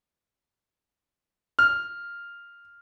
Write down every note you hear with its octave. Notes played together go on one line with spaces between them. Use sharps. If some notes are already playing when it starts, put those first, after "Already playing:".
F6